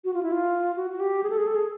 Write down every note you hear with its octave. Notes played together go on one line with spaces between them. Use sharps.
F#4
F4
E4
F4
F#4
F#4
G4
G#4
A4
G#4
A4
G#4